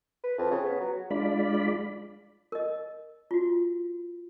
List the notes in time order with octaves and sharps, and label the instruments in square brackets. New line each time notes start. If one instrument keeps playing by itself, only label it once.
[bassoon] B4
F2
C#3
B3
F#3
[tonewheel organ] G#3 D4 F4 D5 B5
[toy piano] A#4 D#5
F4 F#4